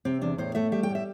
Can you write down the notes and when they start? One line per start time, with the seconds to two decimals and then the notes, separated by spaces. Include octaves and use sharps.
0.05 C3 C4
0.21 E2 D4
0.38 A2 C5
0.55 A3 E5
0.72 G3 E5
0.83 G5
0.89 A2
0.95 E5